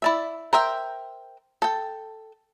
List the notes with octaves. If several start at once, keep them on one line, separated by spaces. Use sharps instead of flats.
E4 D5 E5
A#4 C5 E5 G5
A4 G5